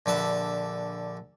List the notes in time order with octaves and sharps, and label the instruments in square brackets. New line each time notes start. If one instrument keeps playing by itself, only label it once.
[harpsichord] A#1 D3 B4 E5